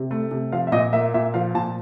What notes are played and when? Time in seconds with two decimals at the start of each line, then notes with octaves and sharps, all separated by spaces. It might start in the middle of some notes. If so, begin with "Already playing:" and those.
Already playing: C3
0.11 A3
0.31 C3
0.52 F3 F5
0.67 E5
0.72 A#2 D#5
0.93 A#3 E5
1.14 A#2 E5
1.34 F3 F5
1.54 A#2 A5